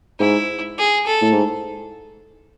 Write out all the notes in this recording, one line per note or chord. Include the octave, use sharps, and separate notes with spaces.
G#2 E4
G#4
A4
A2
G#2